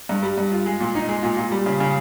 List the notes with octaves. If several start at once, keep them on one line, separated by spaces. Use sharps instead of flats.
G2
G3
G2
F4
G#3
A#2
D#4
G#3
A#2
A#2
G3
C#3
C#3